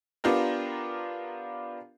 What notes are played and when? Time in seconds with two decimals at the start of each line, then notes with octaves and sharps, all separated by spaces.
0.24 B3 D4 F4 G4 A#4